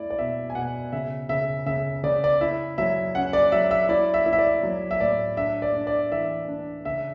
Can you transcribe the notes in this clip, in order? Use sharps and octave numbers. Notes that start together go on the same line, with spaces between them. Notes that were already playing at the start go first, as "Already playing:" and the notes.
Already playing: A3 E4 D5
D5
B2 E5
G#5
B2 F#5
C#3 E5
C#3 E5
C#3 E5
C#3 D5
D5
E4 E5
F#3 E5
C#4 F#5
D5
F#3 E5
E5
E4 D5
E5
E4
E5
D5
F#3
E5
A2 D5
D4 E5
D5
D4
D5
E3 E5
D4
C#3 E5